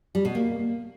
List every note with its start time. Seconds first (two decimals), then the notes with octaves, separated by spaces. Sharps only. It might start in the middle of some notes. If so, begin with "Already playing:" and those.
0.15 G3
0.25 B2
0.35 A#3